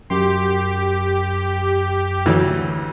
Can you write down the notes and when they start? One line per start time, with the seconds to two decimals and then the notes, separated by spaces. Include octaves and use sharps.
0.10 F#2 G4 C6
2.26 D2 E3 F#3